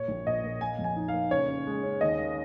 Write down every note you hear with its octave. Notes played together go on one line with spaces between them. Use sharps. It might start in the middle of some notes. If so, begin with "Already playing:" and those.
Already playing: A#2 C#5
A#1
A#2 D#5
A#2
A#3 G#5
F2
G#5
D#4
F5
A#3
C#3 C#5
C#4
G#3
C#4
D#2 D#5
A#3